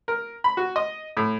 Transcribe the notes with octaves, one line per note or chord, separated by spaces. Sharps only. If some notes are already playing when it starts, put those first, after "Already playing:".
A#4
B5
F#4
D#5
A2